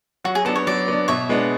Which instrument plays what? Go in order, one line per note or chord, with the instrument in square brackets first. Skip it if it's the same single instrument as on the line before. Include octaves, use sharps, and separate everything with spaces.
[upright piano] F#3 [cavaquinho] F#4
[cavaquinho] G#4
[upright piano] B3 D4 [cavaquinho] A4
[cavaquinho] C#5
[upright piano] F#3 [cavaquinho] D5
[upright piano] B3 D4
[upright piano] B2 [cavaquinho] C#5 E5
[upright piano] G#3 B3 D4